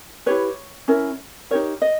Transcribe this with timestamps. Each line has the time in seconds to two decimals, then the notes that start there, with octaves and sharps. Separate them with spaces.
0.26 E4 G4 B4 C#5
0.88 C#4 E4 A#4
1.51 D#4 G4 A#4 C#5
1.82 D#5